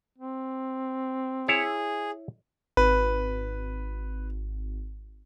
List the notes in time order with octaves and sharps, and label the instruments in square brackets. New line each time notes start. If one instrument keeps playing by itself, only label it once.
[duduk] C4
[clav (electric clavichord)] E4 C#5 [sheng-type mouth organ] G#4
[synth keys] G#1 [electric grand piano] B4